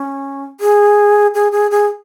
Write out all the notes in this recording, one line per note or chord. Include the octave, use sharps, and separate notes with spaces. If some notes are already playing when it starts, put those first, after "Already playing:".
Already playing: C#4
G#4
G#4
G#4
G#4